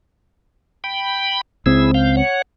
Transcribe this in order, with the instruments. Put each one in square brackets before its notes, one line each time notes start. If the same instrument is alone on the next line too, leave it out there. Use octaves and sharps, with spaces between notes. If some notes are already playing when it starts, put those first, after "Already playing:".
[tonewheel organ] G5 B5
[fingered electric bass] C#2 C4 [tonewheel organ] E4 G#4 E6
[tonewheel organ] F5 G6
C#5 F#5